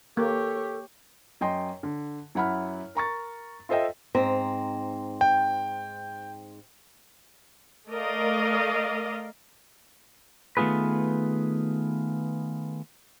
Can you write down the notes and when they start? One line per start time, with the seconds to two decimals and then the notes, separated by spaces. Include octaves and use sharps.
0.17 A#3 G4 A4 C#5
1.41 F#2 D#5 G5 C6
1.83 D3
2.35 F#2 E4 F#5 B5 F6
2.95 A#4 A#5 C#6 A6
3.69 F4 A4 C5 D#5 E5 G5
4.15 G#2 C4 A#5
5.21 G5
7.89 A3 A#4 D5 D#5 F5
10.57 D#3 A3 B3 F4 G#4 B4